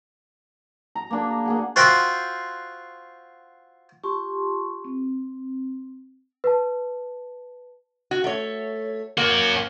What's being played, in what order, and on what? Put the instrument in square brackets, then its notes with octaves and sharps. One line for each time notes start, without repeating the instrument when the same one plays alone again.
[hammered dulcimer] A#5
A#3 D4 G#4
A#5
A#3 G#4 F#5
[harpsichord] F4 F#4 C5 E5 G5
[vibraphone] F4 G4 A5 C6 C#6
C4
[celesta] B4 A5
[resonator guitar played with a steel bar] F#4
A3 C#5
[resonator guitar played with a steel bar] A#3 [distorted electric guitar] C#4 F#4